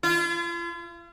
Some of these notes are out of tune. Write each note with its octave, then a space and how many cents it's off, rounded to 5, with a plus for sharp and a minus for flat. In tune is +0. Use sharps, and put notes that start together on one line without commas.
F4 -40